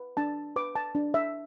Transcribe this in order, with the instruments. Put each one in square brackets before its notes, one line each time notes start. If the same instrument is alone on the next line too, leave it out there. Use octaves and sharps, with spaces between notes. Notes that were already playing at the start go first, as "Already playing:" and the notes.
Already playing: [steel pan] B4
D4 A5
B4 D6
A5
D4
E5